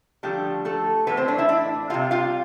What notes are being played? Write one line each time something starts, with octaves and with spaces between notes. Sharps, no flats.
D3 F3 G3 A3 G4
A3 A4
A2 E3 A3 B3 B4
C4 C5
D4 D5
E4 E5
D4 D5
C3 G3 F4 F5
F4 F5